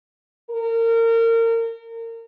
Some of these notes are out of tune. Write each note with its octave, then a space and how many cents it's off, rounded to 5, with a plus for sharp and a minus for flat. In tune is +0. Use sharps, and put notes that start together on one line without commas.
A#4 -30